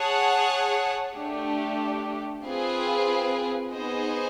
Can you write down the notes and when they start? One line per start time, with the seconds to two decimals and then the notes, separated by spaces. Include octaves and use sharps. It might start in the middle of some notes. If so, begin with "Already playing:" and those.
Already playing: G#4 C#5 F#5 A5
1.16 A3 D4 G4
2.45 C4 F4 G#4 B4
3.74 B3 D#4 G#4 C5 D#5